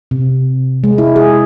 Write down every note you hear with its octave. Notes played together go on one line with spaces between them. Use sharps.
C3
G#3
E4
G#4